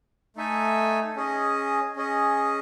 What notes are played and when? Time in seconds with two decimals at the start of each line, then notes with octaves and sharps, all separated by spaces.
0.36 A3 D#4 A4 E5 G#5
1.16 C#4 G#4 D#5
1.96 C#4 G#4 D#5